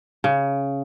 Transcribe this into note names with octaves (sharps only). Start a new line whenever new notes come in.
C#3